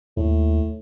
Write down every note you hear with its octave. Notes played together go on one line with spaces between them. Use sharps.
D#2 A2